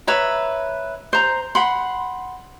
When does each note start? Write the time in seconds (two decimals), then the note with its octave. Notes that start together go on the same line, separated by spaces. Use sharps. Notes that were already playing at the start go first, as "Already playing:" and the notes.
0.07 B4 C#5 E5 A#5
1.13 C5 A#5
1.55 F#5 B5 C6